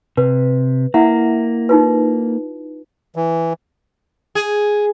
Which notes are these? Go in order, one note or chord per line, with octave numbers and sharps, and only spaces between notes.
C3 B4
A#3 E4 E5 F#5
D#4 F4 B4
E3
G#4